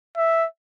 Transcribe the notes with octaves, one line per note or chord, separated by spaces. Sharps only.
E5